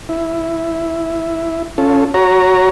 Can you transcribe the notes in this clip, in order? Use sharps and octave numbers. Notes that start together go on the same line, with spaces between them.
E4
C#4 F4 A4
F#4 C#5 A#5